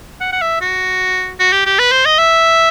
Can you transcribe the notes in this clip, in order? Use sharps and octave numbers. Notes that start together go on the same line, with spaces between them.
F#5
F#5
E5
F#4
F#4
G4
G4
B4
C5
D#5
E5